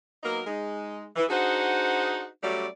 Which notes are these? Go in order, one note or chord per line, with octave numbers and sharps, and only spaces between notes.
F#3 A#3 B3 D#4 A#4
G#3 D#4
E3
D4 D#4 F#4 G#4 C5 F#5
F#3 G3 A3 C#4 D5